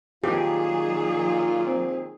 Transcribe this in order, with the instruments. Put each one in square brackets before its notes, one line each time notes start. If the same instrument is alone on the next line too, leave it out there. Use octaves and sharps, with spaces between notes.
[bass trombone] A#2 [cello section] D#3 F#3 G#4 [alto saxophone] F4 [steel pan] G4
[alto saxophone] C4